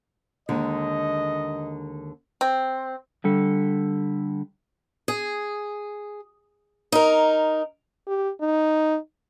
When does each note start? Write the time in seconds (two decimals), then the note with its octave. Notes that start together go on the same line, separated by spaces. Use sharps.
0.49 D#2 D3 G#3 D#5
2.41 C4
3.24 D3 G3 A4
5.08 G#4
6.92 D#4 A#4
8.08 G4
8.41 D#4